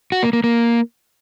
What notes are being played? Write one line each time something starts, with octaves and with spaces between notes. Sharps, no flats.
F#4
A#3
A#3
A#3